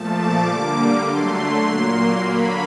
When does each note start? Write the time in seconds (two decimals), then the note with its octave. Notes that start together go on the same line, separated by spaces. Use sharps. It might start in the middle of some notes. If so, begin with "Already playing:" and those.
Already playing: A#2 F3 A3 A5
0.13 D6
0.42 D3 G3 A#3 D6
1.02 D3 F#3 A3 C6
1.62 A#2 F#3 A#3
2.22 D3 F#3 A#3 B5